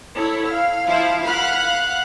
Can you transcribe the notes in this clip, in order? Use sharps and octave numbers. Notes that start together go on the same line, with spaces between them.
E4 A4 C#5
F5 F6
F3 E4
F5 F#5 B5 F6 F#6
F#6